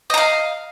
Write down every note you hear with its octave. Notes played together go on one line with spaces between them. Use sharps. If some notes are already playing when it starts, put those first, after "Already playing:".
D#5 F5 A#5